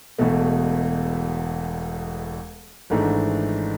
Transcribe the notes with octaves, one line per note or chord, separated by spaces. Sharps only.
E1 E2 B2 A3
G#1 G#2 E3 A3 D4